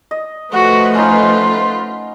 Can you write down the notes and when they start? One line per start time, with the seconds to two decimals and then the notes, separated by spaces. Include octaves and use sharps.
0.11 D#5
0.53 F3 A3 F#4 B4 F#5
0.95 C#4 D#4 F4